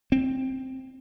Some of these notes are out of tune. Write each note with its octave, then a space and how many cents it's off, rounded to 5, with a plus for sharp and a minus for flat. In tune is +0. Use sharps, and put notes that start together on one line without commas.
C4 +5